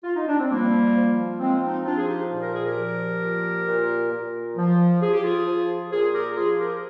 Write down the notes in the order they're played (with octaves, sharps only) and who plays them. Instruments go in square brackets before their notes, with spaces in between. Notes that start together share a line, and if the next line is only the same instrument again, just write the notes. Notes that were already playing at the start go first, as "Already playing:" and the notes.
[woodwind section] F4
D#4
D4
C4
F3 G3 A#3
F3
F3 G#3 C4
C4 D#4
F3 D4 F4
G#4
D#4 G4
A#2
A#4
G#4
G4 A#4
F3
A#2
A#2
A#2
F3
F3 G#4
G4
F4 G#4
F3
A#2 F4 G#4
G4 A#4
F3 F4 G#4
G4 A#4